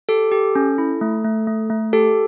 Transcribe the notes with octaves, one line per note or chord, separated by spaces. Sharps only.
G4 A4
G4
C#4
E4
A3
A3
A3
A3
G4 A4